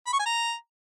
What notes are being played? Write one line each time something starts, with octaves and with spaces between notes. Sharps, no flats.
B5
C#6
G#5
A#5